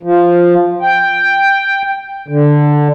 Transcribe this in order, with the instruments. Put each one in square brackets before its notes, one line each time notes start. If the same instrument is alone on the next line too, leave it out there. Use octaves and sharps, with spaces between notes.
[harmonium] F3
G5
D3